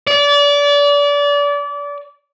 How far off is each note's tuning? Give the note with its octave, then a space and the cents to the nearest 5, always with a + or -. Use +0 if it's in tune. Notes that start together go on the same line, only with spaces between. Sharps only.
D5 -30